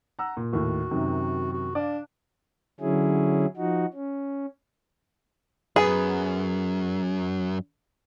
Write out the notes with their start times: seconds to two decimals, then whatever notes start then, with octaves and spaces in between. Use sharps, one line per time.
0.19 F#5 A#5 E6
0.37 A#2
0.53 D#2 A2 F#4
0.91 F#2 C3 D#3
1.53 F#4
1.75 D4 D5 F5
2.80 D3 F#3 C#4 E4 G#4
3.57 F3 D#4 F#4
3.94 C#4
5.76 F#2 B3 G#4